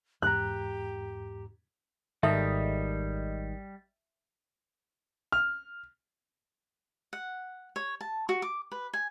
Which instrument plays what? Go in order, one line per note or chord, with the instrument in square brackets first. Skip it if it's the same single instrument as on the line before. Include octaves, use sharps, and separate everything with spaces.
[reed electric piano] E2 G#2 A#5 [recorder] G4 [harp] F#6
[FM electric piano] G#1 D#5 [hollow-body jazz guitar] D#3 G#3 A4 [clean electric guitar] G3 [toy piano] E5
[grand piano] F6
[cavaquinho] F#5
C#5
A5
F#4
D6
B4
G#5